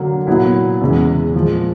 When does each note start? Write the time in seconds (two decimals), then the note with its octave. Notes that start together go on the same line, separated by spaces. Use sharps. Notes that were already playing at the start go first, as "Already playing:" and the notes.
Already playing: D3 F#3 A#3
0.27 A#2 F#3 B3 E4
0.81 E2 C#3 E3 G#3
1.34 A#2 F3 G#3